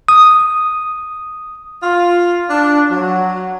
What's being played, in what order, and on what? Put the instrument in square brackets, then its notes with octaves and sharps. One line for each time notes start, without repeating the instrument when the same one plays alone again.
[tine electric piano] D#6
[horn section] F4
D4
F#3